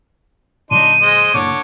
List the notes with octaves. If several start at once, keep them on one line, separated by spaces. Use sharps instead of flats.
A#2 D3 F#3 D4 D#4 C6 D#7
G#3 C5 D#5
F#1 A#2 D3 C#5 D6